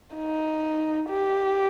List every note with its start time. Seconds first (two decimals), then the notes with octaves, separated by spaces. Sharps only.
0.15 D#4
1.10 G4